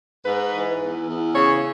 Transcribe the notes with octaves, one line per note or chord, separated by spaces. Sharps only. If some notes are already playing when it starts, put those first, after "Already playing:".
G#2 B4
E3
E2
E2
C#3 C#5